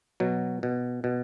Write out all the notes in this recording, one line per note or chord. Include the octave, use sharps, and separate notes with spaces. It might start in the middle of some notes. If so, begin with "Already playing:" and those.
B2 F#3
B2
B2